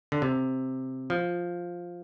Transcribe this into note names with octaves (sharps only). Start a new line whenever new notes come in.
D3
C3
F3